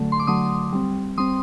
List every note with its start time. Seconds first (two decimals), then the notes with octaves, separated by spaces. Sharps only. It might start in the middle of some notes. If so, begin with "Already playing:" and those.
Already playing: D3 F#3 A3
0.12 C6
0.20 D6
0.27 D3 F#3 A3 C6 D#6
0.73 G3 C4
1.18 G3 C4 C6 D#6